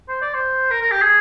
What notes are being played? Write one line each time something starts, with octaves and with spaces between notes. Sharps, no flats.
C5
D5
C5
A#4
A#4
G4
G#4